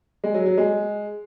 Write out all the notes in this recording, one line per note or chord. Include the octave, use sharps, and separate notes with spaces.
G#3
F#3
F#3
G#3